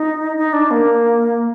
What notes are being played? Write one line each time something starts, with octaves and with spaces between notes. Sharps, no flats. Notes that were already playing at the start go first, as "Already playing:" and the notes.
Already playing: D#4
D#4
D4
A#3